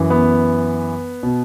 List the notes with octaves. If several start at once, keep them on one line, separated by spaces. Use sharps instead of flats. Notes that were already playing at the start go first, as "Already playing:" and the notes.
Already playing: F#2 E3
B3
B2